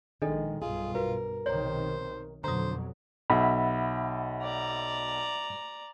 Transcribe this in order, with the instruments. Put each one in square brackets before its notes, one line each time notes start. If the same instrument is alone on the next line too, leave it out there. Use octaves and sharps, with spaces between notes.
[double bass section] A#1 G#3 [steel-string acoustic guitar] D#3 [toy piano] D4 A4 D#5
[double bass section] B1 G2 B2 [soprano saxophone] F4 [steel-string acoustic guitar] G#4
[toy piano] F#4 B4 [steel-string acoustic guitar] A#4
[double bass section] B1 C3 D#3 [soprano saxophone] C5 [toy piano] C#5 A#5
[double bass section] F2 B2 F#3 [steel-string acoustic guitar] D3 [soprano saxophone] C5 [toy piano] A#5 D#6
[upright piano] B1 [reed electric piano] E5 F#5 B5
[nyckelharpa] D5 A#5